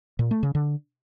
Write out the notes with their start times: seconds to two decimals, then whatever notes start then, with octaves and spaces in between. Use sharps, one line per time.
0.19 A#2
0.31 A3
0.43 C#3
0.55 D3